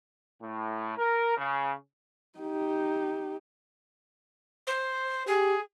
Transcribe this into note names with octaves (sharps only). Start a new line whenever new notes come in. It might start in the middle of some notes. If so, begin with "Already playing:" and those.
A2
A#4
C#3
D#4 G4
C5
G4 G#4